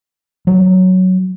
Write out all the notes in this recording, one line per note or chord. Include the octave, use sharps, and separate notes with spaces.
F#3